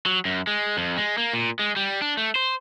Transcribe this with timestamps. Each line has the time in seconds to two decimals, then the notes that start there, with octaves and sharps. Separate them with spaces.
0.06 F#3
0.25 F#2
0.47 G#3
0.77 F2
0.97 G#3
1.18 A#3
1.34 A#2
1.59 G#3
1.76 G3
2.02 D4
2.17 A3
2.36 C5